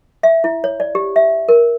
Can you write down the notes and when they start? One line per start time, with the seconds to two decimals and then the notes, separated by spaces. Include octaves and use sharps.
0.23 E5
0.44 E4
0.64 C#5
0.80 D5
0.95 G4
1.16 E5
1.49 A#4